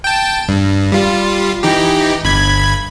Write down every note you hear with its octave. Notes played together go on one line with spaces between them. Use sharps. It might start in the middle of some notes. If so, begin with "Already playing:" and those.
G5 A5
G2
G3 F4
E3 D#4 G4
G1 B5 G#6